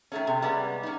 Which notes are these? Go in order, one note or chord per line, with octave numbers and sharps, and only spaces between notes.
D#3 A3 C#4
C3
G3 G#3 B3 C#4
C#4 D#4